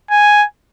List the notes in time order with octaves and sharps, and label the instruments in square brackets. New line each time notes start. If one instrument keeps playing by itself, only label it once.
[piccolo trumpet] G#5